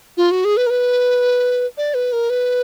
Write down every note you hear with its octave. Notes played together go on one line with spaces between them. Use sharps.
F4
F#4
G#4
B4
A#4
B4
D5
B4
A#4
B4